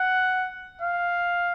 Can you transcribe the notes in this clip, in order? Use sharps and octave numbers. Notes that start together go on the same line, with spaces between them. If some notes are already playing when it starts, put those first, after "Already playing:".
Already playing: F#5
F5